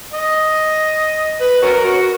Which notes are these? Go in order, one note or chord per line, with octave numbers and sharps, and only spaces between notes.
D#5
B4
C#4 F#4 A#4
F#4